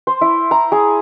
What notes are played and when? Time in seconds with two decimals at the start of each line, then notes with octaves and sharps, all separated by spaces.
0.07 C5
0.21 E4
0.51 A#5
0.72 G#4